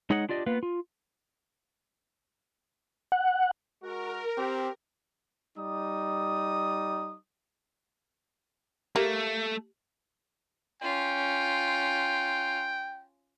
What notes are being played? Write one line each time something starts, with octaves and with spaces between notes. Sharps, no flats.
G#3 D#4 G#4 C#5 D#5 F#5
D4 F4 G4 D5 D#5
A#3 B3 F4 B4
F4
F#5
G#3 F#4 A#4
C4 G4
G3 D#4 D#6
A3 A#3 G4
C#4 F4 G5